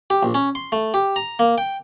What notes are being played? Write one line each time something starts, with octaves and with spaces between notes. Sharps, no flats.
G4
A#1
C#4
C6
A3
G4
A#5
A#3
G5